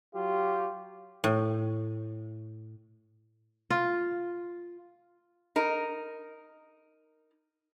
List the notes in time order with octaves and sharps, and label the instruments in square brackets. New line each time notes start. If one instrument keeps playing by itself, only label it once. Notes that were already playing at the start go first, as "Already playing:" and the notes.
[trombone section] F#3 F4 G4
[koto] A2
[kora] F4
[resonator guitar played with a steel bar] D#4 A#4